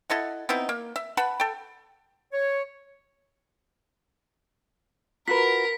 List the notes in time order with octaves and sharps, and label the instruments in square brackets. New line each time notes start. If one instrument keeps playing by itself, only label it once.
[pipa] E4 A4 D#5 F#5
B3 C4 D#4 E4
A#3
E5
B4 F#5 A5 B5
A4 G5
[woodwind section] C#5
[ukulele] F4 F#4 B4 [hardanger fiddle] A#4 [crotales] B6